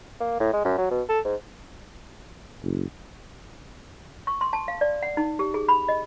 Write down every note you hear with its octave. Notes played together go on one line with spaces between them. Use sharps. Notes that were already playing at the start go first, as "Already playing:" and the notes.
A#3
A2
G#3
F#2
F#3
B2
A4
G#2
F#1
C#6
C6
A5
F5
D5
F#5
D#4
G4
G#4
B5
D#5